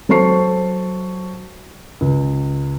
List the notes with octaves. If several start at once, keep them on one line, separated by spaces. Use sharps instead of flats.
F#3 A4 C5 A5 C#6 C7
C#2